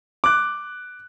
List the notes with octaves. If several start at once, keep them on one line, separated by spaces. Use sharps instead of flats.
D6 F#6